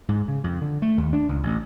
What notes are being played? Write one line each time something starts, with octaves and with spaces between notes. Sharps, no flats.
G#2
C#3
F2
D3
A3
D#2
D4
C#2
A1